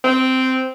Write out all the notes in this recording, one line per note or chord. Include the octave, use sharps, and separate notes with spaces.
C4